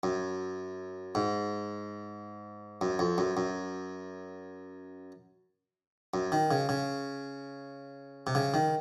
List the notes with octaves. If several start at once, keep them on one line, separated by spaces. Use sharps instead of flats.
F#2
G#2
F#2
F2
F#2
F#2
F#2
D#3
C#3
C#3
C3
C#3
D#3